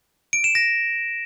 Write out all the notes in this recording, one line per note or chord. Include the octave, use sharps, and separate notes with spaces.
D7
E7
A#6